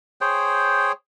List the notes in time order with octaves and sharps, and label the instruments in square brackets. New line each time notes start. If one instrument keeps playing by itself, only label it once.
[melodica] G#4 C5 C#5 G5